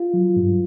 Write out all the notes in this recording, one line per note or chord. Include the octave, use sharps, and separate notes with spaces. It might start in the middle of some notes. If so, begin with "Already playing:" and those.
Already playing: F4
F#3
G2